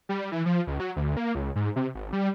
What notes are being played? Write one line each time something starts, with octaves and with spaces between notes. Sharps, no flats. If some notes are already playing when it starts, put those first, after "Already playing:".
G3
E3
F3
C#2
F#3
D2
A#3
C#2
G#2
C3
G#1
G3